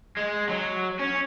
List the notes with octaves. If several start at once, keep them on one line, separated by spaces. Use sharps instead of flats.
G#3
F#3
C#4